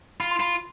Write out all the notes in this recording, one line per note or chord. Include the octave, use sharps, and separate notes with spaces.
F4 B5
C6
F4 B5